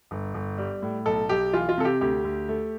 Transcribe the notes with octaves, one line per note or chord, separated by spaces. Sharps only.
G1
G1
G3
A2
B1 A4
B1 G4
E3 F4
F4
C3 A4
G4
D2 G4
D2
A3